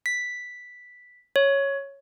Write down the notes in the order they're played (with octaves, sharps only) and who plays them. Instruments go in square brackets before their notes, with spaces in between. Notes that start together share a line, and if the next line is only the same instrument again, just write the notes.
[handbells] B6
C#5